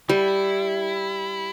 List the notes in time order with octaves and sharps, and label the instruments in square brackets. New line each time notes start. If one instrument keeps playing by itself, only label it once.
[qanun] G3 [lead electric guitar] E4